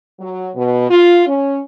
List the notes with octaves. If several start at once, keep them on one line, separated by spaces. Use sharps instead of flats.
F#3
B2
F4
C#4